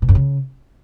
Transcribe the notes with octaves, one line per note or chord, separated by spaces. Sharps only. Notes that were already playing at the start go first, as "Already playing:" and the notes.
B2
F#2
C#3